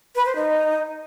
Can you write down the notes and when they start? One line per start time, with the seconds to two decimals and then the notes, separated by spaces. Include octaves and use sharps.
0.15 B4
0.25 C5
0.36 D#4